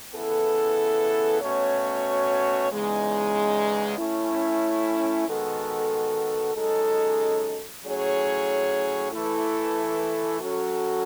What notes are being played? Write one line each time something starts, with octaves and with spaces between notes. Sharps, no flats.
C#3 E3 B3 E4 A4
B2 A3 C#4 F#4 C#5
E2 C#3 G#3 D#4
A3 C#4 E4
D#3 G#3 B3 F#4 A4
F#2 C#3 G#3 D#4 A4
A2 F#3 C#4 G#4 C#5
E3 A3 E4 A4
F#3 C#4 F#4 A4